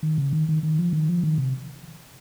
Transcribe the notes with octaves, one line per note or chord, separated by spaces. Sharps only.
D#3
C#3
D#3
D#3
D#3
F3
D#3
F3
D#3
C3